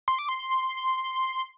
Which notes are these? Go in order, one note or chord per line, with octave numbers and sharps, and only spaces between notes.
C6
D6
C6